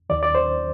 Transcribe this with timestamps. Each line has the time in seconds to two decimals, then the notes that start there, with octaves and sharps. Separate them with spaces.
0.10 D#2 D#3 D5
0.23 D5
0.35 C5